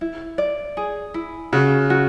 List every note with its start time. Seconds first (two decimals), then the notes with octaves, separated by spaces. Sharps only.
0.01 E4
0.38 D5
0.77 G#4
1.14 E4
1.52 C#3 F#4
1.90 F#4